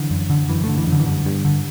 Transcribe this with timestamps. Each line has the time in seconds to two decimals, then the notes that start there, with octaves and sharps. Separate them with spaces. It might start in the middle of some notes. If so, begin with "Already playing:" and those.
Already playing: D3 E3
0.10 F#2
0.30 D3
0.48 F#2 E3
0.64 D3 A3
0.78 E3
0.87 F#2
0.92 D3
1.00 E3
1.06 G2 D3
1.25 G2
1.45 D3